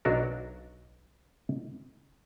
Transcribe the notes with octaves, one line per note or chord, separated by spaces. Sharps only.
B1 F#3 D4 F#4 A#4